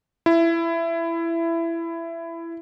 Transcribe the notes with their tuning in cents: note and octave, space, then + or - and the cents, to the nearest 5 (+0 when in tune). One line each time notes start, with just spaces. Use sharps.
E4 +20